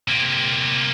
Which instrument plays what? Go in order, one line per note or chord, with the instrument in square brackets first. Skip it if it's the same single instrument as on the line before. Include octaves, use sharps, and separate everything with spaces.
[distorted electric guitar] C3 A#3